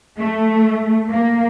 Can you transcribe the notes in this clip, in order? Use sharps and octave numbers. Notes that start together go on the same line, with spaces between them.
A3
A#3